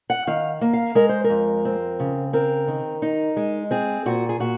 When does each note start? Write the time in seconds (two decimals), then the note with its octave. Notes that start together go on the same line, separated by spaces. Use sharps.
0.10 F#5
0.27 D#3 F5
0.61 A#3
0.73 F5
0.95 G#3 A#4
1.09 C5
1.24 A#4
1.30 F2
1.65 C4
2.00 C#3
2.33 C4 A#4
2.68 D#3
3.02 D#4
3.37 G#3
3.71 C4 G#4
4.06 A#2 F#4
4.29 G#4
4.40 A#2 F#4